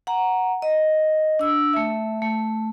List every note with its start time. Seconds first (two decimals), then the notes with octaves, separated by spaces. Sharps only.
0.07 F#5 A#5
0.62 D#5
1.39 D4 E6
1.73 A3 E5
2.22 A3